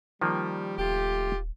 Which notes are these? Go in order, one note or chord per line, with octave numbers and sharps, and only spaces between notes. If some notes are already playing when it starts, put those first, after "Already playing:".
D#3 F3 G3 A#3
D#1 A3 F4 G4